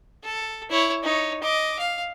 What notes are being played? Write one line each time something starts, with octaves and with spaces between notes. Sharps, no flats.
A4
E4 C#5
D#4 C#5
D#5 D6
F5